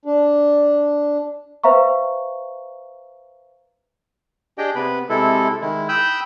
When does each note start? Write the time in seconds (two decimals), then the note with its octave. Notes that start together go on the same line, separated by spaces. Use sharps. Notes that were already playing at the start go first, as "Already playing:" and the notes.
0.05 D4
1.64 B4 C5 E5 F5 A#5 C#6
4.58 D4 G4 G#4 D#5 G5
4.75 C3 B3 B4 B5
5.09 C3 G#3 E4 A4
5.61 D#3 G#3 E4
5.89 G5 B5 D#6 E6 F#6 G6